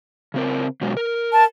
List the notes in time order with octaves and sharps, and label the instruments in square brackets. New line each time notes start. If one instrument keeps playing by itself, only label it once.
[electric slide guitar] C#3 C4 A#4
B2 F#3 G#3
A#4
[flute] A5